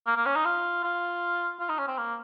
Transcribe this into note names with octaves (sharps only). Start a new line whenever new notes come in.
A#3
A#3
C#4
D#4
F4
F4
F4
D#4
C#4
C4
A#3